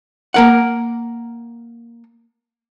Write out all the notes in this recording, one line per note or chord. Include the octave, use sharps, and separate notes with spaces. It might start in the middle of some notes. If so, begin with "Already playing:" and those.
A#3 A#4 F#5